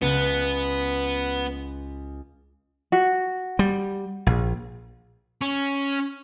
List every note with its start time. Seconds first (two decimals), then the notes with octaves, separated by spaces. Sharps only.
0.02 C#2 B3 F#6
2.92 F#4
3.59 G3
4.26 A#1
5.41 C#4